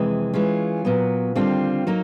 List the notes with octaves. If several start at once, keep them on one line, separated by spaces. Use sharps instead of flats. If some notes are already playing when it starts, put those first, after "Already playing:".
Already playing: F2 C3 E3 G#3
E3 G#3 C#4 F4
A#2 F#3 B3
D#2 D3 G3 C4 F4
F#3 A#3 D#4